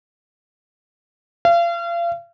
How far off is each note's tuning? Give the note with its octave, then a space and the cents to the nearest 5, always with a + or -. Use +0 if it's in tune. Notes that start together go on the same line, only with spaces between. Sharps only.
F5 -35